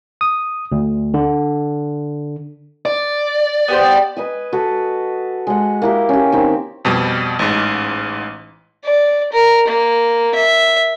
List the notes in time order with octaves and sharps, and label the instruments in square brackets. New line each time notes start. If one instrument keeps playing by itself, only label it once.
[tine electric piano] D#6
D2
D3
[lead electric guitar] D5
[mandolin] B3 G4 C5
[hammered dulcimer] B4 D#5 G#5
F#4 A4 B4
G#3 F#5
A#3 E4 G4
C#4 G4
D#3 C4
[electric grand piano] F2 B2 G3
A1 G#2
[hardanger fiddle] D5
A#4
A#3
E5